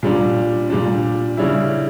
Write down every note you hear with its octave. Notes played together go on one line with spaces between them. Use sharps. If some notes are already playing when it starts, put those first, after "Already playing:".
A#2 G3 D4
A#2 G3 D4
C#3 G3 C#4 E4